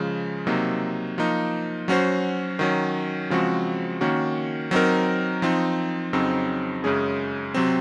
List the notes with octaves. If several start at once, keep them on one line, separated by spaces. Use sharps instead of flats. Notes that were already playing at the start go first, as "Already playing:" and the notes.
Already playing: C#3 F3 G#3
C3 F#3 A#3 D#4
F3 A#3 D#4
F#3 C#4 F#4 C5
D#3 F#3 C#4
C#3 F3 G#3 C4 F#4
D#3 A#3 C#4 F#4
F#3 C4 D#4 A#4
F3 C4 D#4
F2 C#3 F#3 C4 D#4
F#2 C#3 G#3 C#4 G#4
C3 F#3 C4